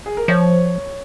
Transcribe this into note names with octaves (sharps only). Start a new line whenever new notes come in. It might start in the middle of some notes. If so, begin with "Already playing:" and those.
G#4
A#4
F3 C#5